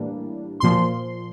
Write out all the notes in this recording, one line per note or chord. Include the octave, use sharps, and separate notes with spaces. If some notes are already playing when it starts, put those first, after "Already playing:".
Already playing: A2 E3 G3 A#3 D4
A#2 F3 C6